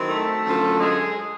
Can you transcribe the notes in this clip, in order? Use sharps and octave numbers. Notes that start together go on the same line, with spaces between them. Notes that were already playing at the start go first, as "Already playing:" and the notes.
Already playing: D#3 F#3 C4 E4
A3 A4
F#2 D3 F3
G#3 G#4